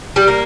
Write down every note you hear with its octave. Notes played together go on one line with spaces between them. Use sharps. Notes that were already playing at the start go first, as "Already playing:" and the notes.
G3
A#3